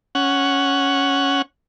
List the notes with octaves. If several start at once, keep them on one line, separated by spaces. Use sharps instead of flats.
C#4 F#5